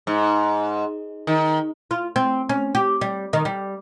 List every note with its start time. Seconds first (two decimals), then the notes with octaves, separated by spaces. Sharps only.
0.07 G#2
1.27 D#3
1.91 F4
2.16 C4
2.49 C#4
2.75 G4
3.01 G3
3.33 D#3
3.45 G3